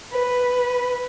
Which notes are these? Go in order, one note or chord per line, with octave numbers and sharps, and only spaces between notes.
B4